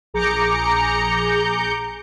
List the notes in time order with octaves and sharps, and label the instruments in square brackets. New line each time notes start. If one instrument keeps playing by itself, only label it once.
[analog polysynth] A#1 G#4 A#5 D6 G6 C#7